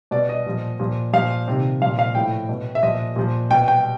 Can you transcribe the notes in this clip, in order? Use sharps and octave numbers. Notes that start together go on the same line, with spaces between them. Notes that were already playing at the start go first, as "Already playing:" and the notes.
B2 D5
D#5
A#2 F3
A#2 F3
A#2 F3 F5
C3 D#3
A#2 F3 F5
F5
A2 F3 G5
B2
E5
A#2 F3 D#5
A#2 F3
B2 G5
G5